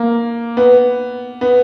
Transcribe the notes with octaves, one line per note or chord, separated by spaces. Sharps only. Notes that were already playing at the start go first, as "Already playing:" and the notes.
Already playing: A#3
B3
B3